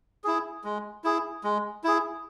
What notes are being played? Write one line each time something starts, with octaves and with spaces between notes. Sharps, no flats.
E4 G#4
G#3
E4 G#4
G#3
E4 G#4